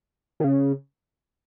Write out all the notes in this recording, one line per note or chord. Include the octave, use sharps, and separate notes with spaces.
D#3
C#3